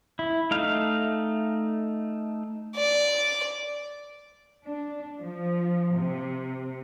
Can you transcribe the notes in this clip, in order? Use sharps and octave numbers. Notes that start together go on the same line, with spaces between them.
E4
A3 D#4 F5
D5
D4
F3
C3